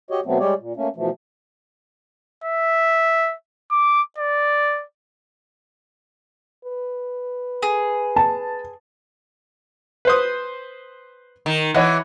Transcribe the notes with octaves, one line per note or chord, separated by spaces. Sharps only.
F#4 G4 C#5 D#5
B2 F#3 A3 B3 C4
G3 G#3 G4 C#5 D5
A#2
A3 A#3 C#4
B2 E3 F3 A3
E5
D6
D5
B4
G#4
A5
B4 C5 D#6
D#3
E3 C#5 D#5 F#5